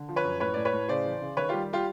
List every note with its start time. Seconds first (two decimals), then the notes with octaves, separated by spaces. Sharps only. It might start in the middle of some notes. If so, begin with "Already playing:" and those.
Already playing: D3
0.09 F3
0.16 B4 C#5
0.24 F#2
0.40 A2 B4 C#5
0.54 A2 D5
0.65 B4 C#5
0.73 A2
0.88 C#3 C5 D5
1.05 E3
1.21 C#3
1.37 D#3 B4 C#5
1.49 G3 F4 G4
1.73 F4 G4